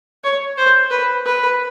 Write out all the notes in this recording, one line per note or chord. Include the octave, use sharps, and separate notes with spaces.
C#5
C5
B4
B4